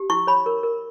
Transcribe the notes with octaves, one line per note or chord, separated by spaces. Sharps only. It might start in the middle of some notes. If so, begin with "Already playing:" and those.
Already playing: G4
E4 C#6
C#5 B5
A#4
A#4